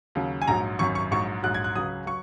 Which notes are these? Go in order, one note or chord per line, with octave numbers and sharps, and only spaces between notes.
D#2 C#3 F#3
G#5
A#1 G#2 F#3 A#5
G#1 F#2 F#3 C#6
C#6
A#1 G#2 F#3 C#6
A#1 G#2 F#3 F#6
G#6
F#6
C#2 C#3 F#3 D#6
F#3 C#6